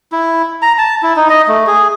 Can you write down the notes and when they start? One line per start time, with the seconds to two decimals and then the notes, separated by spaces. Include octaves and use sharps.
0.12 E4
0.62 A#5
0.78 A5
1.03 E4
1.16 D#4
1.30 D#5
1.48 A3
1.67 G#4